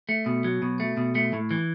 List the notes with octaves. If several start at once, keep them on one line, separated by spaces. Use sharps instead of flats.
A3
B2
F#3
B2
A3
B2
A3
A2
E3